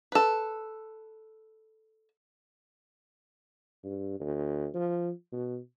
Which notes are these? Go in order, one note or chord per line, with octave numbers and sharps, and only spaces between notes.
A4 B4
G2
D2
F3
B2